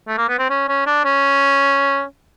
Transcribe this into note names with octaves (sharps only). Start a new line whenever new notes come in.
A3
A#3
B3
C4
C#4
C#4
D4
C#4